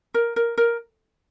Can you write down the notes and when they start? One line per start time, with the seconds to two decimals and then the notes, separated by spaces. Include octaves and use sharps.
0.14 A#4
0.36 A#4
0.58 A#4